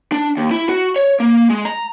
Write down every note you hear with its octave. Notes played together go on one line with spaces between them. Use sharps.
D4
D#2
E4
F#4
C#5
A#3
G#3
A#5